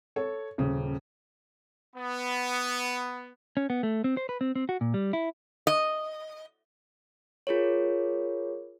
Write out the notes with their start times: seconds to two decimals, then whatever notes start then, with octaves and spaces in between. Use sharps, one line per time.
0.16 A4 C#5
0.58 D#1 C#3
1.96 B3
3.57 C#4
3.70 B3
3.83 A3
4.04 C4
4.17 C5
4.29 B4
4.41 C4
4.56 C4
4.69 F#4
4.81 A#2
4.94 G3
5.13 E4
5.67 D#5
7.47 F4 G#4 A#4 C#5